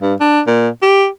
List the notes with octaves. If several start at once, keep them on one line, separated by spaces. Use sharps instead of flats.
G2
D4
A#2
G4